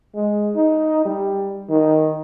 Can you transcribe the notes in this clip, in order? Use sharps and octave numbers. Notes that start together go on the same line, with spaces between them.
G#3
D#4
G3
D#3